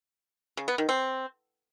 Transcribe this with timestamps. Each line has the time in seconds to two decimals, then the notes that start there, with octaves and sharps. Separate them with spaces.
0.57 C#3
0.68 B3
0.78 D#3
0.89 C4